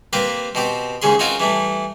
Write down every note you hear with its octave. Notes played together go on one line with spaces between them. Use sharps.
A#3 C4 G4 B4
B2 C4 G4
D#2 G#2 C#3 G#4 C6
C4 C#4 D#4 F4 F#4 A#4
E3 G3 A3